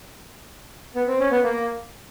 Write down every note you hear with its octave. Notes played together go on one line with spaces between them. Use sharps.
B3
C4
C#4
B3
A#3